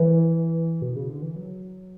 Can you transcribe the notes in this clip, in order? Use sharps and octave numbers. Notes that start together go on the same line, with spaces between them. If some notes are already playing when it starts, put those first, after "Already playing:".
Already playing: E3
B2
C#3
D3
E3
F#3